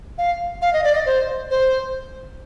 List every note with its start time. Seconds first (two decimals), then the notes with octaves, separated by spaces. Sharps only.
0.18 F5
0.62 F5
0.73 D#5
0.84 D5
0.95 D#5
1.06 C5
1.51 C5